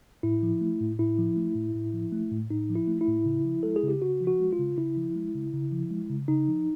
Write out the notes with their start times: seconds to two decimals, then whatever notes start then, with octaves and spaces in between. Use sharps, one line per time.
0.23 A2 E4
0.43 F3
0.61 A3
0.80 A2
0.99 A2 E4
1.18 F3
1.37 A3
1.55 A2
1.75 A2
1.94 F3
2.12 A3
2.32 A2
2.50 A2 D#4
2.70 F3
2.75 E4
2.88 A3
3.01 E4
3.08 A2
3.25 C#3
3.45 F3
3.63 G#3 A4
3.76 G#4
3.83 C#3 G4
4.02 C#3 F#4
4.20 F3
4.27 F#4
4.40 G#3
4.53 F4
4.59 C#3
4.77 C#3 E4
4.97 F3
5.16 G#3
5.35 C#3
5.54 C#3
5.72 F3
5.90 G#3
6.10 C#3
6.28 C#3 D#4
6.48 F3